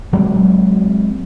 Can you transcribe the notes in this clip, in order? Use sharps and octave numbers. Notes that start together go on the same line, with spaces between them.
F#3 G#3 A#3 C4